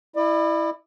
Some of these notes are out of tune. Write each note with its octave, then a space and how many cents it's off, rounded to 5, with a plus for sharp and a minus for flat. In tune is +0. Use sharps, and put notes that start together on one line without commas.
E4 +0 D5 +40